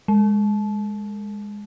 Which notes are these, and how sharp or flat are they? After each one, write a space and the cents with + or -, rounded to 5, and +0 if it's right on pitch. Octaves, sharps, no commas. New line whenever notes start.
G#3 -10